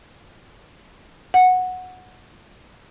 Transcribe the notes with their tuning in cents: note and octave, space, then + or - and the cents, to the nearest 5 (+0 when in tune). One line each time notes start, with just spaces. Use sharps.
F#5 -10